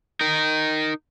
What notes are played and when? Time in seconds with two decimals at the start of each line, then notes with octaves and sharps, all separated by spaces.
0.21 D#4 A#4